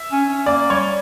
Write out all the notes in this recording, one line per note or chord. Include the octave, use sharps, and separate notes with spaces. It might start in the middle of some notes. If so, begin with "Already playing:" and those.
Already playing: E5
C#4
C#4
A#3 D5
G3 C#5